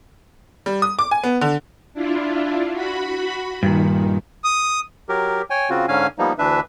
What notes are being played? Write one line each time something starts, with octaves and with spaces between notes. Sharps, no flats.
G3
D#6
D6
G#5
B3
D3
D4 E4 F4
F#4 B5
G2 A#2 D#3
D#6
F#3 G4 A#4
C#5 G5 G#5
C#3 C4 F4 F#4
G#2 D3 C#4 F5 G#5
F3 G3 A#3 B3 D#4
D2 E3 D4 B4 E5